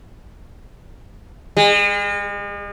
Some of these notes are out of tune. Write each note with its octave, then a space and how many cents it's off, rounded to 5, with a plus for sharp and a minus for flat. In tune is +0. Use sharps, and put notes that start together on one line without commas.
G#3 -40